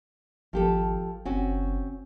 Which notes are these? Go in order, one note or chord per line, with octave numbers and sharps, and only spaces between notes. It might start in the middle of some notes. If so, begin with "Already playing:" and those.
G#1 F3 G4 A4
F#1 C4 C#4 F#4